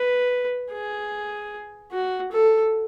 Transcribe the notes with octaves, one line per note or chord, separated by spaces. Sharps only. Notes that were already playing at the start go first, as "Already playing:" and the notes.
Already playing: B4
G#4
F#4
A4